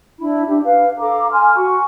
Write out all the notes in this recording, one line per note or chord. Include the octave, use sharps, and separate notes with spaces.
D4 E4 B5
D4 G4
B4 F5
A4 F5 A#5 D6
G#5 C6 F6
F#4 G#5 C#6